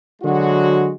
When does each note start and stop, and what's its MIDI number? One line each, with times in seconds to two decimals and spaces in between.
0.22 0.91 50
0.22 0.91 54
0.22 0.91 56
0.22 0.91 66